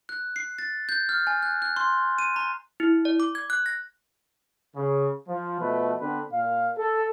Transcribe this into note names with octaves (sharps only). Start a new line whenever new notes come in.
F#6
C7
A6
G6
F6
G#5
F#6
F#6
C6
D#7
A#5
E4
D5
D6
G#6
F#6
A#6
C#3
F3
B2 F3 A3 B4
D3 B3 C4 D4 B4
A#2 F5
A4